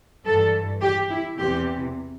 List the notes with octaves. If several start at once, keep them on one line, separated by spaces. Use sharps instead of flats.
G2 E3 A4
G4
E4
E2 C3 E3 G4